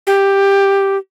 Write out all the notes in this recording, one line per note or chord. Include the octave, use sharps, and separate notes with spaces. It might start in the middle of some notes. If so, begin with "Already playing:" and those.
G4